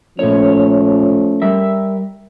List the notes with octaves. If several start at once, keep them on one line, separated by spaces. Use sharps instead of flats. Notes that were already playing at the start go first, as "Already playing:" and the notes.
A#2 F3 A3 C#4 C#5
G3 A#4 E5